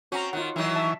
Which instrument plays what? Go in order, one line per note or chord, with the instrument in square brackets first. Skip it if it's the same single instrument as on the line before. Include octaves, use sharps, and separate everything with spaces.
[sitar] C4 C#4 [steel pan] F#4 A#5
[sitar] D#3 [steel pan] F4 F#5
[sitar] D#3 F#3 [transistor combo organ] E3
[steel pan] E5 A5